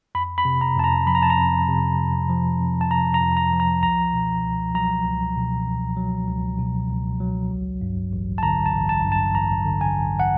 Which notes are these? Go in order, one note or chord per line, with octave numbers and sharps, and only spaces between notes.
F2 B5
B5
C3
A#5
F2 A5
A#5
F3 B5
A#5
A5
A#5
F2
C3
F2
F3
F2
A5
C3 A#5
A#5
F2
A#5
F3
A#5
C#2 A#5
B2
C#2
F#3 A#5
C#2
B2
C#2
F#3
C#2
B2
C#2
F#3
A1
G2
A1
A5
D3 A#5
A5
A1
A5
G2
A5
A1 A#5
D3
G#5
A1
F#5